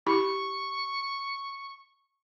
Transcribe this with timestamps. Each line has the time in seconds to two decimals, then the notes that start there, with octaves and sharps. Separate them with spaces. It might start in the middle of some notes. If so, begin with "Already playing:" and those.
0.07 E4 G4 B5 C#6